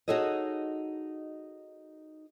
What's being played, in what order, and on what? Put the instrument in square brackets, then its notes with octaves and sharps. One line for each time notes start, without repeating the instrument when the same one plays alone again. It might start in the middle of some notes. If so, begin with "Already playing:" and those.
[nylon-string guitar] D#4 F#4 G#4 A4 C#5 D#5